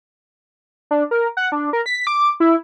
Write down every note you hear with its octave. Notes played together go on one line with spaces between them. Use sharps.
D4
A#4
F#5
D4
A#4
B6
D6
E4